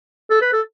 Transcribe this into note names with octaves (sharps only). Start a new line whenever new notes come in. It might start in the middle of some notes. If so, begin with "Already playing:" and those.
A4
B4
A4